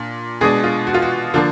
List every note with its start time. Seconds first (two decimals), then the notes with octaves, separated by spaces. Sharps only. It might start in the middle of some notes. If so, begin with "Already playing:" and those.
Already playing: A#2 D4
0.41 B2 G#3 D4 G#4
0.64 F4
0.87 F#4
0.94 F4
1.02 F#4
1.34 D3 F3 A#3 D4